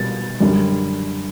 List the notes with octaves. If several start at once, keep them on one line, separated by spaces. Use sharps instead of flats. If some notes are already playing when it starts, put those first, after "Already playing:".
Already playing: B2 G3 B3 A6
F#2 D3 G3